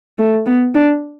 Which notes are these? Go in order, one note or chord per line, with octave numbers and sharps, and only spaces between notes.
A3
B3
D4